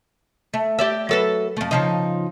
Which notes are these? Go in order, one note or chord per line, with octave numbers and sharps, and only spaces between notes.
A3
G4 D5 E5
F#3 A4 B4
F2 A3
C#3 F3 D#4